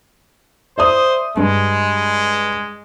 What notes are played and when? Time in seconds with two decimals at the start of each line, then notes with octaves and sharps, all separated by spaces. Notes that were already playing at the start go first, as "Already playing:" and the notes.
0.78 C5 D5 E5 D#6
1.37 G2 G#3